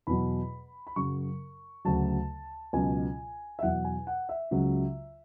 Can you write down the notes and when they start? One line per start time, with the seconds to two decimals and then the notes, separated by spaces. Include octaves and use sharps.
0.07 E2 B2 F#3 B5
0.87 B5
0.96 F#2 C#3 F#3 C#6
1.85 D2 C#3 F#3 A5
2.73 C#2 B2 F#3 G#5
3.59 E5
3.62 E2 B2 F#3 F#5
3.84 G#5
4.07 F#5
4.29 E5
4.51 C#2 C#3 F#3